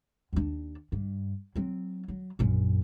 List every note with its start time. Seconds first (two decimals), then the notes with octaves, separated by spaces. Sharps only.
0.33 D#2 D4
0.92 G2
1.55 F#3 C4
2.08 F#3
2.39 A#1 F#2